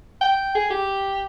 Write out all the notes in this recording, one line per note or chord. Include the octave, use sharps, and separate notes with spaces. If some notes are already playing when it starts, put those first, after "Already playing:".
G5
G#4
G4